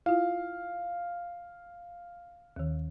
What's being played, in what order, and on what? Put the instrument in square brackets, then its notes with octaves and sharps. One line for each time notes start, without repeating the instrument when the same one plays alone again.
[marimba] E4 F4 [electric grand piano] F5
[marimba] D#2 D#3